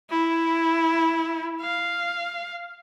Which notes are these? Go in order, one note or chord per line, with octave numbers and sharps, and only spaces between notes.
E4
F5